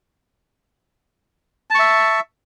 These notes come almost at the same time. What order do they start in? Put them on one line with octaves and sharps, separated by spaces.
A5 C#6 E5